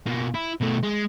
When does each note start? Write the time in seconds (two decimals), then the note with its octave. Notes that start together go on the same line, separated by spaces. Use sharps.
0.06 B2 A#3
0.34 E4
0.61 B2 A3
0.83 G#3